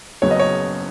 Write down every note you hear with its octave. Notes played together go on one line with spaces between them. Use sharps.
F#1 F#2 C#3 F#3 B3 C#5
D#5
C#5